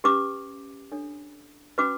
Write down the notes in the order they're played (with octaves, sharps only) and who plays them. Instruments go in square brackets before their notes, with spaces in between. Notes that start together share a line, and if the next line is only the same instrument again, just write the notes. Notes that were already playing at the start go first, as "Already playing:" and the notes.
[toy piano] C#4 G4 B4 D6
D4 A4 C#5
C#4 F#4 B4 D6